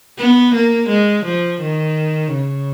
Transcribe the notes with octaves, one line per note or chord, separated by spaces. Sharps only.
B3
A#3
G#3
F3
D#3
C#3